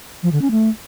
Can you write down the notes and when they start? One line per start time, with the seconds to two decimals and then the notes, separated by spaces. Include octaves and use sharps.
0.23 F3
0.32 D3
0.42 C#4
0.51 A3